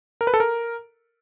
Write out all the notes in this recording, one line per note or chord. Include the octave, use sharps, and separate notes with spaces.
A#4
B4
A4
A#4